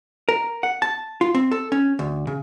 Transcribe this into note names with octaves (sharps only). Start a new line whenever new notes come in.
A#4
F#5
A5
F4
C4
A4
C#4
D2
C#3